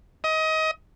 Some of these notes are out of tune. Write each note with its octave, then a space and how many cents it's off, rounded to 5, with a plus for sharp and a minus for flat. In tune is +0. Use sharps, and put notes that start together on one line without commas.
D#5 +25